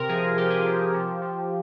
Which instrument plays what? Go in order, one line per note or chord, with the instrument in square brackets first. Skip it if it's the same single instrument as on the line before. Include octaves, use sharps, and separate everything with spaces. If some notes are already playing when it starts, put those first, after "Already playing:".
Already playing: [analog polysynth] C3 A#4
F3 G#4
F3 G4
G#4
F3 G4
F3
F3